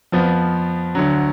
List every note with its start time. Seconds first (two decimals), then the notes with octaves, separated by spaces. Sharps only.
0.12 F2 F3 B3
0.95 D2 D3 F#3